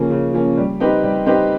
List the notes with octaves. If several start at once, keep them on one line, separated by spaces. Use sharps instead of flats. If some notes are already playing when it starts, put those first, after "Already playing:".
Already playing: C#3 F3 A#3 C#4
C#3
F3 A#3 C#4
G3
C4 D#4 G4 B4
G3
C4 D#4 G4 B4